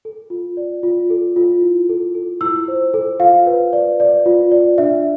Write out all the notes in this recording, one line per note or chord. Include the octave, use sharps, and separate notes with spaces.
A4
F4
D5
F4
A4
F4
E4
A4
A4
E4 E6
C5
A4
F4 F5
B4
D5
D5
F4
D5
D4 E5